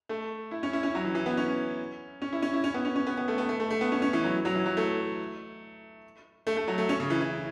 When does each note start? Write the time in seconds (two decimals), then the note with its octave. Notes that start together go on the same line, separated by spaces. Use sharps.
0.09 A3
0.51 E4
0.63 C#4
0.73 E4
0.83 C#4
0.95 F#3
1.04 E3
1.15 E3
1.26 B3
1.37 C#4
2.22 C#4
2.33 E4
2.42 C#4
2.54 E4
2.64 C#4
2.74 B3
2.85 C#4
2.96 C#4
3.07 B3
3.18 B3
3.28 A3
3.38 B3
3.49 A3
3.60 A3
3.70 A3
3.81 B3
3.92 C#4
4.02 C#4
4.13 E3
4.24 F#3
4.45 F#3
4.55 E3
4.66 F#3
4.77 A3
6.47 A3
6.57 A3
6.68 F#3
6.78 A3
6.89 C#4
7.00 C#3
7.10 E3
7.21 E3